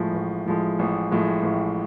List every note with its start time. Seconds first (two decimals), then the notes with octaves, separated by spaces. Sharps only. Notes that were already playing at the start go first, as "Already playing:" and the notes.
Already playing: A1 A2 F3 G#3
0.14 A1
0.46 A2 F3 G#3
0.79 A1
1.11 A2 F3 G#3
1.43 A1